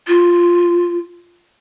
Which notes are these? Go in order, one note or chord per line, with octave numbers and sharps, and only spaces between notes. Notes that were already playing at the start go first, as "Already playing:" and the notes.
F4